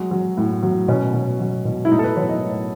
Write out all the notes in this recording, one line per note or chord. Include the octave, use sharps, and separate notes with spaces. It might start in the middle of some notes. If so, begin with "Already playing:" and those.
Already playing: F#3 G#3
F#3
A2
F#3
B2 C#4
B2
F#3
B2
E4
A2 D#4
A4
B4
F#3 C#5
D#5
A2